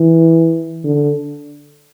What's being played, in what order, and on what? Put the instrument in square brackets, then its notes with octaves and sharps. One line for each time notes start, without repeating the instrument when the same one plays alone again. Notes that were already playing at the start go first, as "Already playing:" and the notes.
Already playing: [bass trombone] E3
D3